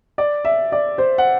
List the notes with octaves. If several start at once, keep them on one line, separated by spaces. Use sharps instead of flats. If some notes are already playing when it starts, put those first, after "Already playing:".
D5
E5
D5
C5
F#5